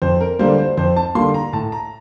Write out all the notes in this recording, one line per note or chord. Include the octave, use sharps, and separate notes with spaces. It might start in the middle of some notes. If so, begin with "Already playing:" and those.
F2 C5
A#4
D3 G3 A#3 C5
C5
F2 C5
A5
D3 G3 A#3 C6
A#5
A2 A5
A#5